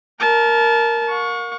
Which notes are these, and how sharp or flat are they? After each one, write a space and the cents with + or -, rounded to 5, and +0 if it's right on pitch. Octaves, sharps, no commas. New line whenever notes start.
A#4 +0 A5 -25
F5 +45 C#6 +5